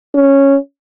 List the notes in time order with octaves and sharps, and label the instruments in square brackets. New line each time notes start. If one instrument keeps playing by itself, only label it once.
[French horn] C#4